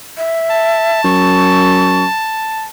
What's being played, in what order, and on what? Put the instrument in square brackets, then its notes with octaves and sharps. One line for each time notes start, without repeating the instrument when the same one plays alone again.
[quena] E5
[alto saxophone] A5
[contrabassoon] F#2 [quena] C#6